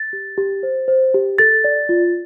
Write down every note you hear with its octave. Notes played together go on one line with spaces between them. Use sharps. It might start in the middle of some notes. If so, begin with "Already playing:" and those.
Already playing: A6
G4
G4
C5
C5
G4
A4 A6
D5
F4